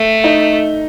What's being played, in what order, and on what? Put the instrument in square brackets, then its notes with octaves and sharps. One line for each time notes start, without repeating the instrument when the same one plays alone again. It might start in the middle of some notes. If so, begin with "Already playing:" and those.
Already playing: [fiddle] A3
[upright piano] D#4